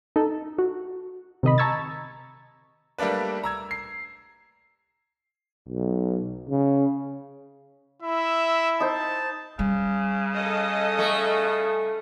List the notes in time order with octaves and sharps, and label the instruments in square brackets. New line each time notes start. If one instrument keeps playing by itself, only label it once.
[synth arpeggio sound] D#4 A4
F#4
C3 D#3 D#5 B5
A5 A#5 C#6 E6 G#6 A6
[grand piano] G3 A3 A#3 D4 B4
A#5 E6 G#6
C7
[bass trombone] B1
C#3
[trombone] E4 [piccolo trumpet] E5
[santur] D#4 C5 [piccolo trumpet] A5
[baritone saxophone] C#3 [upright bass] G3
[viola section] A4 D#5
[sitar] A3